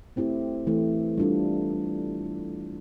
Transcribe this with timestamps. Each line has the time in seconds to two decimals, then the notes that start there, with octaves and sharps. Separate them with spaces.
0.16 A3 C4 E4 G4
0.67 E3 A3 E4 A4
1.17 G3 D4 F4 A4